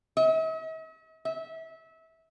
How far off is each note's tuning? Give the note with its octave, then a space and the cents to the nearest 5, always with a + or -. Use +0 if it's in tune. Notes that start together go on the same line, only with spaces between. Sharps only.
E5 -45
E5 -25